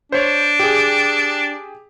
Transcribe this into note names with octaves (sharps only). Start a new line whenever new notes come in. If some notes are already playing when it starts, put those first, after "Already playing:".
D4 C5 C#5
G4 G#4